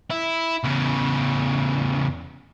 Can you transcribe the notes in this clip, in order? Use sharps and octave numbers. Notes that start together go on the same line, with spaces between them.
E4
E2 C#3